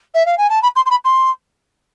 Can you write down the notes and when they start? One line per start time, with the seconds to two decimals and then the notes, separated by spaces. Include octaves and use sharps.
0.15 E5
0.26 F5
0.38 G#5
0.50 A5
0.63 B5
0.76 C6
0.86 C6
0.90 B5
1.05 C6